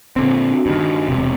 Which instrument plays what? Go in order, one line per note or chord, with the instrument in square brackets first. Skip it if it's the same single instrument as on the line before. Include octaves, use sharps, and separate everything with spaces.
[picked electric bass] A#2 D3 C4
[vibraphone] D4 F#4
[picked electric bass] G2 D#3
E1 C3